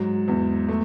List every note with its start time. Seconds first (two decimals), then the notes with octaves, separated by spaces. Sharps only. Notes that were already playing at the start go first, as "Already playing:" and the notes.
Already playing: G#2 F#3
0.28 E2
0.68 A3